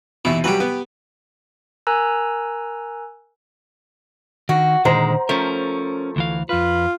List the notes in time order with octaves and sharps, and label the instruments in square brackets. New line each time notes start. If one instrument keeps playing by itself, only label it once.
[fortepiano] D#2 B2 [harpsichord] E3 E4
[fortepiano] E3 F#3 G3 [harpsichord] G4 B4
[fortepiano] B3
[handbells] A#4 G#5 A#5 E6 F#6
[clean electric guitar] D#3 [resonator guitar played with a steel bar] F#4
[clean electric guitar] A#2 D3 D#3 [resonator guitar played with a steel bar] G#3 [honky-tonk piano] C5 A#5
[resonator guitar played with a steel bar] F3 A3 [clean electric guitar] C#4 A#4
[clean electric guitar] D2 E3 F5
[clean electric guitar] F2 B4 [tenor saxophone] F4